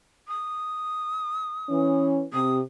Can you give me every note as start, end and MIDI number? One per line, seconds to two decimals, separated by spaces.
0.28 2.04 87
1.69 2.23 52
1.69 2.23 61
2.33 2.60 48
2.33 2.55 87